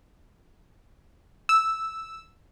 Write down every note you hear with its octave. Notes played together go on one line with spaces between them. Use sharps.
E6